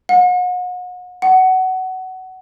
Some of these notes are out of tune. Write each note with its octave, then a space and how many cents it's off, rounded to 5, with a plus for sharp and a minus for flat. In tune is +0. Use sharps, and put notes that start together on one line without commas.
F#5 -40
F#5 +20